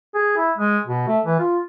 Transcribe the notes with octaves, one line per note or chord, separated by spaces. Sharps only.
G#4
E4
G#3
B2
A3
E3
F4